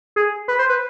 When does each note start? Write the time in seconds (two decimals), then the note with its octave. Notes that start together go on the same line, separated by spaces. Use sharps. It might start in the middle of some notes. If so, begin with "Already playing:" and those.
0.16 G#4
0.48 B4
0.59 C5
0.70 B4